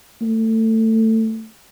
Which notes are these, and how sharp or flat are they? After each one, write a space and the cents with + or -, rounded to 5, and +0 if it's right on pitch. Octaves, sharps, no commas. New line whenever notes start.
A3 +20